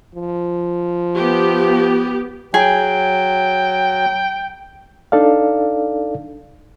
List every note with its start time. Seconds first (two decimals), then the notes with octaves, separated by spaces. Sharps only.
0.15 F3
1.14 B3 G4
2.54 F#3 G#4 G5
5.12 D4 D#4 A4 D5 F5